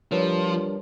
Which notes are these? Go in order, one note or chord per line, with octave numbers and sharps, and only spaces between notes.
F3 G3 D4 A#4 B4 C#5